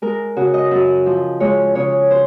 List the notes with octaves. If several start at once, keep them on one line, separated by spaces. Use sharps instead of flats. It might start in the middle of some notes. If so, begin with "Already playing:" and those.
G#3 A#4
C#3 F#4
D#5
F#2
F3
G#3 C#5
C#3 C#5
C5